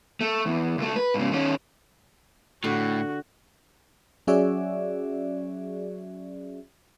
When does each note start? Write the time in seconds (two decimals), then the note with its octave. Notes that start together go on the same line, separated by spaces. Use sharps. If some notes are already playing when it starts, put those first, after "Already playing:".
0.21 A3
0.46 E2
0.78 C#2 A3
0.96 B4
1.14 G#2 C#3
1.31 D#3 C#4
2.64 A2 D3 F#4
4.27 F#3 C#4 F#4 G#4 D5 E5